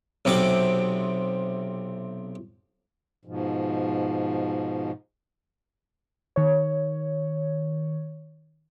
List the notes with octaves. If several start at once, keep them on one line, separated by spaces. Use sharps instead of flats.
B1 C3 C4 D6
G#2 B2 F3
D#3 C#5